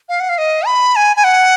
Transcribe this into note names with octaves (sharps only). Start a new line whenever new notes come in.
F5
F#5
F5
D#5
B5
G#5
G#5
F#5